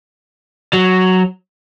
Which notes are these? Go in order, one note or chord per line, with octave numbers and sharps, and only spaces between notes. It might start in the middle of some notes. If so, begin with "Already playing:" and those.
F#3